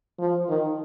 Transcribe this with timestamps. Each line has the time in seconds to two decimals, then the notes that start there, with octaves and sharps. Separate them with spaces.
0.19 F3
0.49 D#3